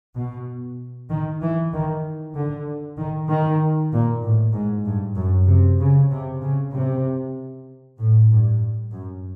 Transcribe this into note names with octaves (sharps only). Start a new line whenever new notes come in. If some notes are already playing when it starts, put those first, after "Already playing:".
B2
D#3
E3
D#3
D3
D#3
D#3
A#2
A2
G#2
G2
F#2
C3
C#3
C3
C#3
C3
A2
G2
F#2